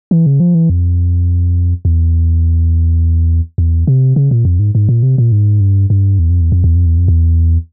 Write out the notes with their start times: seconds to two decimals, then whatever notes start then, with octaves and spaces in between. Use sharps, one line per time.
0.11 E3
0.26 C#3
0.40 F3
0.55 E3
0.70 F2
1.85 E2
3.58 E2
3.87 C3
4.16 C#3
4.31 A#2
4.45 F2
4.59 G#2
4.75 G#2
4.89 A#2
5.03 C3
5.18 A#2
5.32 G#2
5.61 G2
5.90 G2
6.19 E2
6.30 F2
6.41 E2
6.52 F2
6.64 E2
6.76 F2
6.86 E2
6.98 F2
7.08 E2